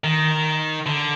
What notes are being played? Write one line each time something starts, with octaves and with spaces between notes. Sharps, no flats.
D#3
D3